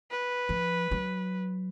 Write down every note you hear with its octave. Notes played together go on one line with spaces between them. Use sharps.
B4
F3
F#3